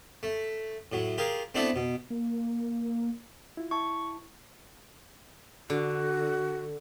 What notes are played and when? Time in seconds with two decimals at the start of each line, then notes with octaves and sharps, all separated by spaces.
0.23 A3
0.92 A2 F#3
1.18 F4 G4 G#4 A#4
1.55 A3 B3 C4 D4 E4 A4
1.76 B2
2.10 A#3
3.57 E4 F4
3.71 E4 A5 C#6
5.70 D3 F#4